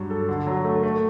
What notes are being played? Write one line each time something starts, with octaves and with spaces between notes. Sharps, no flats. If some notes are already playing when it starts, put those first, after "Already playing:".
Already playing: G2 F#3 F#4
A4
D3
F#3
A3
A3